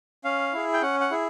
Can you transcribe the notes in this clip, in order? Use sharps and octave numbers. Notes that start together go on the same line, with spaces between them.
C#4 F5
E4 G#4
G5
C#4 F#5
F#5
E4 G#4